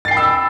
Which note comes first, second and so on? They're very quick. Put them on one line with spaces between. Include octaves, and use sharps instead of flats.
A6 C7 G5 B5 E6